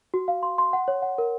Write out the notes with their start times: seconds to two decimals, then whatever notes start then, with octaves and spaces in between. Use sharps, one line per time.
0.14 F#4
0.28 F5
0.43 C6
0.58 C6
0.73 F#5
0.88 C#5
1.02 F#5
1.18 A#4